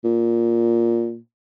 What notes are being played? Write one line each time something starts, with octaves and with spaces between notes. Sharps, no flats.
A#2